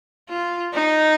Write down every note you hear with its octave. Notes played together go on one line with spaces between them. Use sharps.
F4
D#4